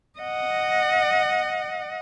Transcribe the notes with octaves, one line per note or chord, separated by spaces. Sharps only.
D#5 F#5